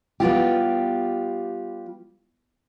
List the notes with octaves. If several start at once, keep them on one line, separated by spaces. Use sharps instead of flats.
G3 B3 F4 G4